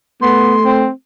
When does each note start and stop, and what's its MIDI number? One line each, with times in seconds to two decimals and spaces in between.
0.22 0.86 57
0.22 0.55 59
0.22 0.77 84
0.65 0.89 60